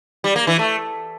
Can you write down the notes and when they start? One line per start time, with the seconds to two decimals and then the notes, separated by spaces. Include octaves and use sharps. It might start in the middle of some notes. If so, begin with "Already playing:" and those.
0.24 G3
0.36 A#3
0.47 E3
0.59 A3